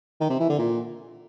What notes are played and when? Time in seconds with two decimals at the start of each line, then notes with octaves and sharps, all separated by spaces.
0.20 D#3
0.30 C3
0.39 E3
0.49 D3
0.59 A#2